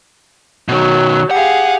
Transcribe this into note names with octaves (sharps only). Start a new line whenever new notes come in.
B2 D#3 F#3
G4 G#4 F5 F#5